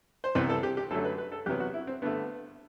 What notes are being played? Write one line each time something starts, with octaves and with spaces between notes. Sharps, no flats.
C5
C2 C3 E3 B3 B4
A4
G4
G4
F#2 D3 F#3 A3 A4
B4
B4
A4
E2 C3 F#3 B3 G4
F#4
E4
C4
G2 D3 A3 B3